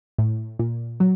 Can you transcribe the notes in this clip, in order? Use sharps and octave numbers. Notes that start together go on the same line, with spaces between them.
A2
A#2
F#3